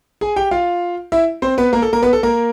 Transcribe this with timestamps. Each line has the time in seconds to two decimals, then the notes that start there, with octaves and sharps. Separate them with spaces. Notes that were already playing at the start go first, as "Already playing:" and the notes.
0.21 G#4 G#5
0.36 G4 G5
0.51 F4 F5
1.12 E4 E5
1.42 C4 C5
1.58 B3 B4
1.73 A#3 A#4
1.82 A4
1.93 A#3 A#4
2.02 B3 B4
2.13 A4
2.23 A#3 A#4